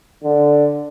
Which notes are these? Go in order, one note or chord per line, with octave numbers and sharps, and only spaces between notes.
D3